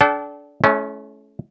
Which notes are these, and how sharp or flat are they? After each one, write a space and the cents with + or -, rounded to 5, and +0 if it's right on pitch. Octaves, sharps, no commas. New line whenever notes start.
D4 -20 A4 -35 G5 -45
A3 -40 C#4 +0 E4 +0